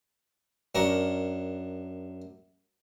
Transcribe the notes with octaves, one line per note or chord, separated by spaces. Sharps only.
F#2 D4 A#4 C#6